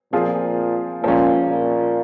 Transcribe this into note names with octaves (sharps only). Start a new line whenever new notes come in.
A#2 F3 C4 F4 G#4
A#2 F3 G#3 C#4
A#2